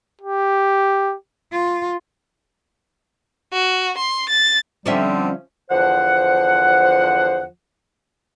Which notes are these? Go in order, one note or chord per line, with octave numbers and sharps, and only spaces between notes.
G4
F4
F#4
C6
A6
D3 F3 G3 C4 C#4 E5
E2 D3 F3 C5 F#5